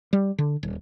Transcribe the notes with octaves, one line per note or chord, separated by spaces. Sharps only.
G3
D3
D#1